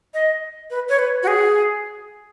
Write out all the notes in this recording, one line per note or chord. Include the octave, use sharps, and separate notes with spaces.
D#5
B4
C#5
B4
F#4
G#4